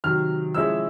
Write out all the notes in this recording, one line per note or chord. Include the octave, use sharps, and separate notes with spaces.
C3 D#3 F#3 F6
F3 G#3 C#4 E4 G#4 E6